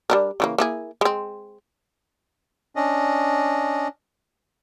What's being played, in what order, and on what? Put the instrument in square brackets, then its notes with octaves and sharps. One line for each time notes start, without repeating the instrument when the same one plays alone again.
[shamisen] G3 D4 A#4
C#3 E3 A#3
A#3 E4 G#4
G#3 C4
[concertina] C#4 D4 D#5